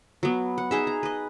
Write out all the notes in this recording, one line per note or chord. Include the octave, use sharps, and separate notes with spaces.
F#3 B3
F#5
D#4 G#4 E5
A#5
B4 D#5